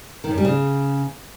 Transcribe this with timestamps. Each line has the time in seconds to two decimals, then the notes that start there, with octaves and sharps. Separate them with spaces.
0.24 D#3
0.31 F#2
0.38 G3
0.45 C#3